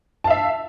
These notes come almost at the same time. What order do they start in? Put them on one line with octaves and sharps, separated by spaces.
A5 F5 E5